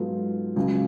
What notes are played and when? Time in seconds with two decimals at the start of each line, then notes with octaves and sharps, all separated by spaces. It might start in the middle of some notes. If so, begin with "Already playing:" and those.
Already playing: G#2 F#3 B3 F4 A4
0.56 C#2 C#3 F#3